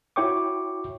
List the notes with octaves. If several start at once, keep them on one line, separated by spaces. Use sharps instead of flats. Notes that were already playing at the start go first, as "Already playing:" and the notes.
E4 F#4 C#5 G5 C#6 D6